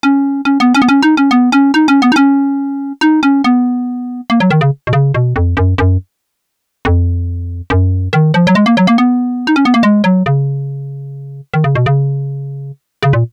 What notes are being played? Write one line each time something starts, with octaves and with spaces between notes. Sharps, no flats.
C#4
C#4
B3
C#4
B3
C#4
D#4
C#4
B3
C#4
D#4
C#4
B3
D#4
C#4
D#4
C#4
B3
A#3
F#3
D#3
C#3
B2
C#3
B2
F2
F#2
F#2
F2
F#2
D#3
F3
F#3
G#3
A#3
F#3
A#3
B3
D#4
C#4
B3
A#3
G#3
F#3
C#3
D#3
C#3
B2
C#3
C#3
A#2